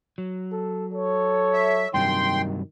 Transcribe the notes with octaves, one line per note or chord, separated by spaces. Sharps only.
F#3
A4
A4 C#5
E5
G2 C3 D#3 F#3 G5 C6